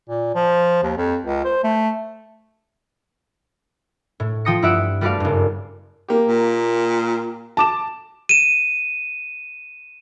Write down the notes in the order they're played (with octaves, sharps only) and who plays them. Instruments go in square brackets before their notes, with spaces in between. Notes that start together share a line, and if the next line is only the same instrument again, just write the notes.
[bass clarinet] A#2
F3
D#2
F2
C#2
C5
A3
[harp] A2
F3 G5 D#6 A#6 C#7
G2 E4 G4 E5 F#5 D7
G3 A3 F#4 B4 D5 F5
F#1 G2
[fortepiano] A#3 G4
[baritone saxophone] A#2
[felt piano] A5 D6 E7
[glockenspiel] D#7 E7